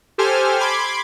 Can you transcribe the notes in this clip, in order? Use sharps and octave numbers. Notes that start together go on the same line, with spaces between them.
G4 A4 C5 G#5 F6
B5 C6 D6 G#6